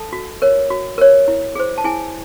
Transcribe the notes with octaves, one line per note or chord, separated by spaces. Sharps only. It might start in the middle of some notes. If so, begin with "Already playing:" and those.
Already playing: A4 A5
F#4
A#4 C#5
F#4
A#4 C#5
E4
G#4 C5
A5
E4 G#4 G#5